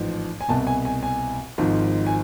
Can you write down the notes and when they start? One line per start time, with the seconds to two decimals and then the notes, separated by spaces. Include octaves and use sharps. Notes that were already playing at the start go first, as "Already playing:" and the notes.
Already playing: A1 G#2 F3
0.41 G#5
0.48 C2 B2 A5
0.67 G#5
0.85 G#5
1.03 G#5
1.58 G#1 G#2 F3
2.06 G#5